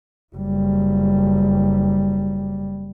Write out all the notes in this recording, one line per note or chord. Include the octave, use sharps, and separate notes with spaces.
F#1 G3